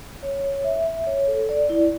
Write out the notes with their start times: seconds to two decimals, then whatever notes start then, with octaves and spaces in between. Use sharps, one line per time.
0.23 C#5
0.44 C#5
0.64 E5
0.85 E5
1.07 C#5
1.28 A4
1.49 D5
1.70 E4